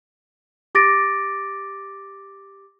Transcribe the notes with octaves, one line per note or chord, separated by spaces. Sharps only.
G4 D6 A6 A#6 D7